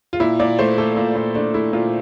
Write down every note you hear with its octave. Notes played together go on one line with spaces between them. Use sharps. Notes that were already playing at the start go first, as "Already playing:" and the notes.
F4
A#2 E4
A#2 D5
A3 C5
A3 A4
A#2
A#2
A3 D4
A3 E4
A#2 F4